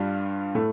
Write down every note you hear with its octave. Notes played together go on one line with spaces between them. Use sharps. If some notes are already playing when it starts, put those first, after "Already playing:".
Already playing: G2 G3 D4 F4
A2 A3